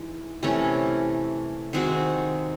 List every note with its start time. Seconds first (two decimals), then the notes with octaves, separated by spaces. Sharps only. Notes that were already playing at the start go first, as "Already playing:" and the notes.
Already playing: E3 G#3 D#4
0.43 C3 E3 A3 C#4
1.73 D#3 G#3 C4 F#4